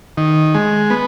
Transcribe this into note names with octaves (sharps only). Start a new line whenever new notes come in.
D#3
G#3
B3